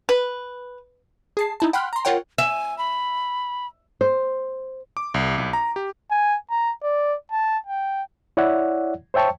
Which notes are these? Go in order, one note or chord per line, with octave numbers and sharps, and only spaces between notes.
B4
G#4 A5 C7
D#4 E4 A5
F#5 G5 B5 C6 F6 F#6
A#5 C6
F4 A#4 C#5 F#5 G5
E5 G#5
B5
C5
D6
C2
B1
A#5
G4
G#5
A#5
D5
A5
G5
E4 C#5 D5 E5 F#5
C5 C#5 E5 G5 A5 C#6